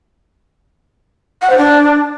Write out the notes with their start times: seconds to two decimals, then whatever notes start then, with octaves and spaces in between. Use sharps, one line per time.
1.42 F#5
1.50 C5
1.58 D4